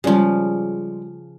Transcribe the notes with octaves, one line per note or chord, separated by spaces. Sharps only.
C#3 F3 G3 G#3 D5